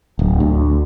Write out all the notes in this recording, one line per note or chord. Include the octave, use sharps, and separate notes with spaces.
D1
D2